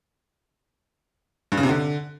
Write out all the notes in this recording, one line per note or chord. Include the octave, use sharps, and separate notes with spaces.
G2
C#3
C3
D3